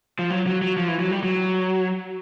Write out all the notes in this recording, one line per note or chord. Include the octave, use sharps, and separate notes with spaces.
F3
F#3
F#3
F#3
F3
E3
F#3
G3
F#3